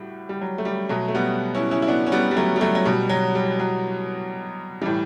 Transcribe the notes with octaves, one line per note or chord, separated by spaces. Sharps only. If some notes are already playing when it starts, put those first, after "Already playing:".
Already playing: A2 G3 F#4
G3
F#3
A3
G3
B2 F#3 A3
A3
G3 B3
C#4 E4
C#4 E4
E4
B3 D4
C#4
G3 B3
G3
F#3 A3
G3
F#3 A3
F#3
B2 G3
F#3
G3
F#3
A2 E3 G3